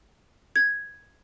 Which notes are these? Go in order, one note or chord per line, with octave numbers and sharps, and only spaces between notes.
G#6